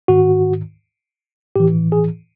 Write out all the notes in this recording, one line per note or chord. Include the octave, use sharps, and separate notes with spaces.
G#2 D#3 F#4
A2 E3 G4
G#4